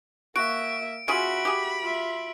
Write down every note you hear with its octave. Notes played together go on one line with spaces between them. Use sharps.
A#3 F#4 E5 D7
C#4 F4 F#4 G#4 E5 B5 D7 F#7
G4 G#4
F4 E5